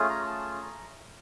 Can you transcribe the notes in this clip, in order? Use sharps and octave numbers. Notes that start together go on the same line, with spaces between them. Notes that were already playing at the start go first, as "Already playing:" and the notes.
Already playing: A3 C#4 F4 G#4
A#5
A5
A#5